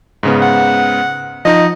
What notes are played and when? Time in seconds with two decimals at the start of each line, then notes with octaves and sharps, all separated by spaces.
0.23 G#2 C#3 B3
0.42 F#5
1.45 F3 D#4 D#5